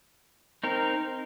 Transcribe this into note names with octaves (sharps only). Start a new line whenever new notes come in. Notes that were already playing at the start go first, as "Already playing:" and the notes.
C4 D#4 A#4